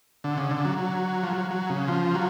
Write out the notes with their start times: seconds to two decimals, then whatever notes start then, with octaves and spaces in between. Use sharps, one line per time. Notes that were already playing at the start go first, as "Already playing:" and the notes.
0.24 D3
0.37 C#3
0.51 D3
0.65 F#3
0.78 F#3
1.23 F3
1.33 F#3
1.51 F#3
1.70 C#3
1.88 F3
2.15 F#3